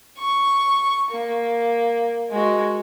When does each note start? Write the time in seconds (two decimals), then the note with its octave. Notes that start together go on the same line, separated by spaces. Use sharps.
0.18 C#6
1.11 A#3
2.31 G#3 F#4